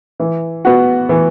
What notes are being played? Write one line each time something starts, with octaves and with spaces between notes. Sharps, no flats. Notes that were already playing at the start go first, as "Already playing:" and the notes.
E3
B3 F#4
E3